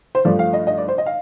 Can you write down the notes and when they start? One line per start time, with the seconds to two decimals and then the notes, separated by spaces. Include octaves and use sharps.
0.15 C5
0.25 G2 F3 A3 D5
0.39 F5
0.53 D#5
0.67 D#5
0.77 D5
0.88 C5
0.98 D#5
1.06 F5